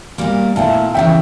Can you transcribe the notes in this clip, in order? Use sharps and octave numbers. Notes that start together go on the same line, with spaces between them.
A#2 G3 A#3
A#2 A3 E4 F5 A5
F2 C#3 E3 E5 G5